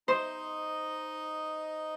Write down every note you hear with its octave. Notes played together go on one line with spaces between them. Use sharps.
D#4 C5 D#5